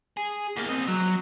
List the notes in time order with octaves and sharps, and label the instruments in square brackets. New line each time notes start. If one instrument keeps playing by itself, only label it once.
[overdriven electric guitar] G#4
E2 A#3
C4 D#5
F#3